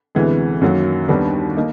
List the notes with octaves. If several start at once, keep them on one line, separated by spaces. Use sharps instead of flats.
D2 C3 E3 G#3 B3
F#2 D#3 F#3 A#3
D#2 D#3 G3 B3 D4
A#3 D#4